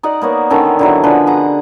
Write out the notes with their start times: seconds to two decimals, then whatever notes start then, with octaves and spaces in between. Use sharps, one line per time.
0.03 D#4 D5 D#5 F#5
0.22 A#3 B3 C#5
0.50 D3 D#3 C#4 A4
0.79 D3 E3 F#3
1.04 D3 F3 B4 G#5
1.27 G#4 F#5 A#5